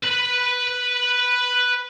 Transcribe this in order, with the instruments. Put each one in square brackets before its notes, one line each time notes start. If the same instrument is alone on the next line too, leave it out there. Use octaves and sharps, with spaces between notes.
[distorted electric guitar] B4 B5